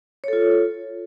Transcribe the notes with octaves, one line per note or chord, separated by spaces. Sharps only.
F4 A4 C#5